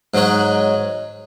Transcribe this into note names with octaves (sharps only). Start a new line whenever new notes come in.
G#2 F#3 D#4 F#4 C#5